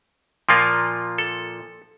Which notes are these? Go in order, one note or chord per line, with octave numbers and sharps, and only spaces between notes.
A#2 F3 A#3 F4
A4